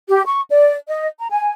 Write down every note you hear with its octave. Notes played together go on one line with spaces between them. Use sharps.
G4
C#6
D5
D#5
A#5
G#5